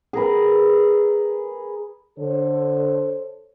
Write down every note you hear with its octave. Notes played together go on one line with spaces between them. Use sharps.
G#4 A#4 B4
D3 A4 C5 C#5